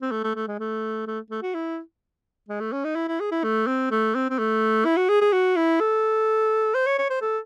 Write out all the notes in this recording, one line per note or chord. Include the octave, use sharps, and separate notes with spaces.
C4
A3
A3
A3
G#3
A3
A3
A3
F#4
E4
G#3
A3
C#4
D#4
E4
E4
G#4
E4
A3
C4
A3
C4
C4
A3
E4
F#4
G#4
G#4
F#4
E4
A4
C5
C#5
C#5
C5
A4